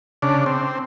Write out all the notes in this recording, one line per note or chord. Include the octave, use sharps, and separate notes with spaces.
C#3 D4
C4